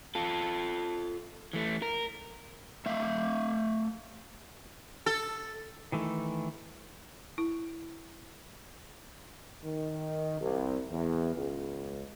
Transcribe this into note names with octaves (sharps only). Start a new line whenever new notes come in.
F4 A4
E3 A3
A#4
A3 E5 F5
A4
D#3 E3 A3
E4
D#3
C2
E2
C#2